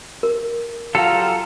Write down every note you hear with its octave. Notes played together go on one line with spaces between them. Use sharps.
A#4
F#3 F4 G4 A4 F#5 A#5